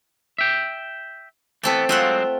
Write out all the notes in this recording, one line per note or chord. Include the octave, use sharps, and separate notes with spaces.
E5 G5
E3 A3 B3 C4 A4
F#3 G#3 C4 F4 E5 F#5